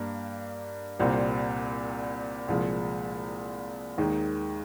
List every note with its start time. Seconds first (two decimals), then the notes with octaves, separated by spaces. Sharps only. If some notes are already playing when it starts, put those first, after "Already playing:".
Already playing: G2 G3 A#3
0.99 C2 A#2 G3 C4
2.48 C2 A#2 F3 G#3
3.98 D#2 D#3 G#3